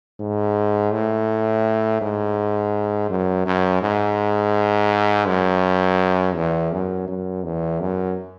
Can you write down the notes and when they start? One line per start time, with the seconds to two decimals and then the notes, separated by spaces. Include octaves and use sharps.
0.20 G#2
0.93 A2
2.02 G#2
3.10 F#2
3.46 F#2
3.82 G#2
5.27 F#2
6.35 E2
6.72 F#2
7.08 F#2
7.44 E2
7.80 F#2